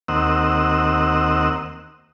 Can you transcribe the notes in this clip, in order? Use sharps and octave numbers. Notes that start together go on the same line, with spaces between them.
D#2 A#3 C4 D#5 F#5 E6